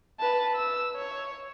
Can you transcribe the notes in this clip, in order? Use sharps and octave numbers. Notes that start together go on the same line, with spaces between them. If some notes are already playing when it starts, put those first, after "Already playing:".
B4 A5
E6
C#5